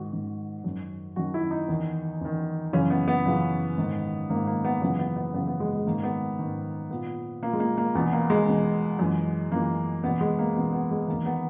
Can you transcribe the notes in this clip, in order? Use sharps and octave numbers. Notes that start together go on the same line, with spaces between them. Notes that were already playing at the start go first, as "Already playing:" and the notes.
Already playing: G#2 D#3 F#4
G#2 D#3
F#2 D#3
F#2 D#3 F#4
E4
D#4
E2 D#3
E2 D#3
F#2 C#3 E3 C#4
B3
B3
F#2 C#3 E3
G#2 D#3
G#2 D#3 A#3
A#3
B3
F#2 C#3 E3 B3
B3
B3
F#2 C#3 E3 B3
B3
G#3
G#3
G#2 D#3 A#3
B3
G#2 D#3
A#2 B3
A#2 A#3
G#3
A#3
A#3
E2 B2 B3
A#3
G#3
E2 B2
F#2 E3
F#2 E3 A#3
E2 B2 B3
G#3
A#3
E2 B2 B3
B3
G#3
E2 D#3 A#3
B3